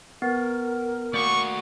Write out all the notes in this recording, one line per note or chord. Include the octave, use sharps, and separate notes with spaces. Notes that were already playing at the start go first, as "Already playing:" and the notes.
B3 A#4
A#3 F#4 D5 C#6